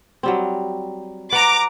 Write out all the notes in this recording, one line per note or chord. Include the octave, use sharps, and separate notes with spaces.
F#3 G3 C4
B4 D5 F#5 A#5 D6